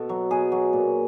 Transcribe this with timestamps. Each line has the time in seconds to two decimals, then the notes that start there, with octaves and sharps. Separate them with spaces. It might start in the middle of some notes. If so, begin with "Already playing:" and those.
Already playing: B2 A4
0.09 F#3
0.31 B2 G#4
0.52 F#3
0.73 A#2